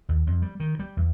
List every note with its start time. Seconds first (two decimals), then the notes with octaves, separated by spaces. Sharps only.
0.09 D#2
0.27 F2
0.42 G3
0.60 D#3
0.79 G3
0.97 E2